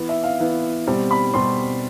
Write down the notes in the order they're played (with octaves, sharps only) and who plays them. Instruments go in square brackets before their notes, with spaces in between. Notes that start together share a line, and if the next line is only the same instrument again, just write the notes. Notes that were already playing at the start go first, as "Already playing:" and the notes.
Already playing: [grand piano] E3 B3
E5
F5
E3 B3
B2 G3 C4
B5
B2 G3 C4 C6